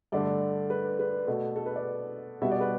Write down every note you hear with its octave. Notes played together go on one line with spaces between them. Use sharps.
G2 D3 A3 D5
B4
B4
B2 A3
A4
B4
D5
B2 G3 B3 E5
D5
B4